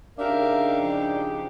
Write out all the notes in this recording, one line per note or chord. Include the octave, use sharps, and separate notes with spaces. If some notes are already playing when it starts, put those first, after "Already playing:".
C#3 D4 D#4 G4 A#4 E5 F5
F3